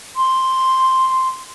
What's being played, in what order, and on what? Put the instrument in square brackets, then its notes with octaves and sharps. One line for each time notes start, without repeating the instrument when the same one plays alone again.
[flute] C6